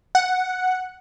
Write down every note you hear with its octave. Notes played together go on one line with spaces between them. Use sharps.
F#5